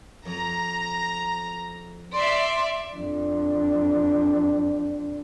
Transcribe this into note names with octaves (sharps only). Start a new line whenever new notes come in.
F2 A#5
D5 E5 C6
F2 D4